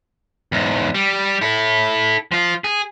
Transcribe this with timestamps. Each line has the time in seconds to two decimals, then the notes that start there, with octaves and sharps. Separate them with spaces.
0.52 E2 G#2
0.94 G3
1.41 E4 A4
2.32 F3 F4
2.64 G#4